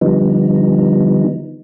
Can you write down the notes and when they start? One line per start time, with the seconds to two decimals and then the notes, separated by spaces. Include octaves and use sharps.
0.01 D3 F3 G3 B3 D#4